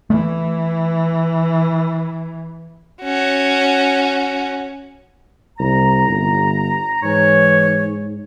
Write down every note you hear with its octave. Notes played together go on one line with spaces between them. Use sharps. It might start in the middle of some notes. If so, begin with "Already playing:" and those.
E3 A3
C#4 F#4
C2 A#5
G1
G#2 E3 C#5